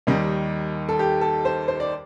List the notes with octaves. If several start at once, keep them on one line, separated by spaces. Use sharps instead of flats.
D#2 D#3 G3 D#4
A4
G4
A4
C5
C5
D5